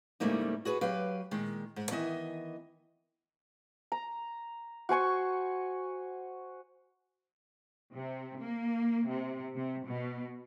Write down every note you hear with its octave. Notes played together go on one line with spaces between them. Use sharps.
G#2 C#3 G3 A3 A#3 D#4
F#4 G#4 B4
F#3 G4 B4 F5
A#2 D#3 G#3
G#2
D#3 E3 B3 D#5 E5 G#5
A#5
F#4 C5 G#5 C#6
C3
A#3
C3
C3
B2